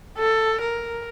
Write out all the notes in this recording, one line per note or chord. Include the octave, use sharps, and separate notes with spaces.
A4
A#4